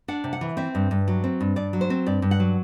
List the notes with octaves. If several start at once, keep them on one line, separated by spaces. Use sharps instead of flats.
D4 F#5
C3
F#5
E3
C4 E5
G2
G2
F#3
C4
G2
G2 D5
F#3
C5
C4
G2 D5
G2
F#5
F#3